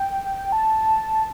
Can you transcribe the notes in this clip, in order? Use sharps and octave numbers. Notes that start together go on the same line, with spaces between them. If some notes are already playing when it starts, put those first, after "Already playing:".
Already playing: G5
A5